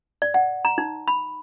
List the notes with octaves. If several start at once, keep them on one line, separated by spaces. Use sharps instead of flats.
D5
F#5
A#5
D#4
B5